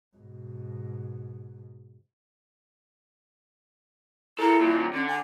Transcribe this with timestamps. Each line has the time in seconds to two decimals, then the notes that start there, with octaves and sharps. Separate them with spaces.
0.17 G#2 B2
4.39 E4 A4 A#4
4.61 D#2 A#2
4.94 D3 C#4
5.07 G#5